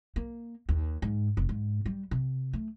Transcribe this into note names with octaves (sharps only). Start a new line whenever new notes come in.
A#3
D#2
G#2
F1
G#2
G3
C3
A3